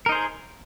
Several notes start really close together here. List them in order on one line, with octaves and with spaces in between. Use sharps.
A#4 D#4 C5 G#4